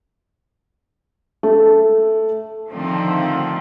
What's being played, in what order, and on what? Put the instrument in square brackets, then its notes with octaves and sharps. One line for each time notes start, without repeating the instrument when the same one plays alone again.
[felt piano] A3
[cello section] D3 D#3 F3 A3 C4